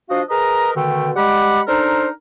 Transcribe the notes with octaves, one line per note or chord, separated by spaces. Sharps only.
F3 D4 F#4 D#5 F5
G#4 A#4 B4 D#5 A#5
B2 D3 D#3 A3 G5
G3 G#3 F#5 B5 D6
D4 D#4 A4 A#4 C5